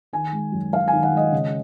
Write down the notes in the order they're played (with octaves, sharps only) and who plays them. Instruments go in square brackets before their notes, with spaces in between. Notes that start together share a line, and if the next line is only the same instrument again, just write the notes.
[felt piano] D#3 G#5
G#3
F#2
F#2 F5
G#5
D#3
F#5
G#3 D#5
C#3